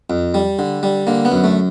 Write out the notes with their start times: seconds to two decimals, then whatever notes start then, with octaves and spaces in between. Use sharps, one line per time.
0.10 F2
0.34 G3
0.59 D3
0.83 G3
1.07 D3 A#3
1.25 B3
1.32 F#2
1.44 A3